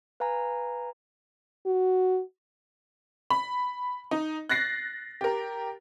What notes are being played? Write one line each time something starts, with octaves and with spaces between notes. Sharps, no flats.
B4 F5 G#5 A#5
F#4
B5
D#4
F#6 A6 A#6 C7
G4 A#4